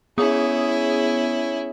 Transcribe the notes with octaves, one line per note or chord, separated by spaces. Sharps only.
B3 C#4 E4 G#4 D#6